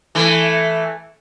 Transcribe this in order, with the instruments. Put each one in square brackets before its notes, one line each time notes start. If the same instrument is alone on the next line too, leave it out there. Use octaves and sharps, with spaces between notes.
[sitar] E3 A3